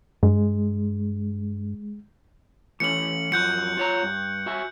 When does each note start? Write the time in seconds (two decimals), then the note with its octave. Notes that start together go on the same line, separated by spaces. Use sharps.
0.23 G2 G#3
2.80 E3 A3 C#4 C#7 F#7
3.32 F#2 F3 F#4 F#6 G6 C#7
3.77 F4 C#5 A#5
4.03 G2
4.46 F#4 E5 G#5